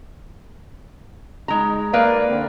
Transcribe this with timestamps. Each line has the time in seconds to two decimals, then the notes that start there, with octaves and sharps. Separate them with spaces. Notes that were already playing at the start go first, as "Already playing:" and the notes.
1.48 G#3 D#4 A#5
1.93 A#3 A#4 B4 D5 F5
2.28 D3 C4